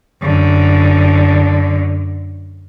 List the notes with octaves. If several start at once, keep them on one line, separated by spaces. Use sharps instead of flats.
F#2 D3